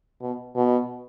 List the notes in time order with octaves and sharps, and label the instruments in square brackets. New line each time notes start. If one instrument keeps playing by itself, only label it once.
[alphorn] B2
B2